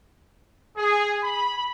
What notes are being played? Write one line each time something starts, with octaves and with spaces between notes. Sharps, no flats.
G#4
B5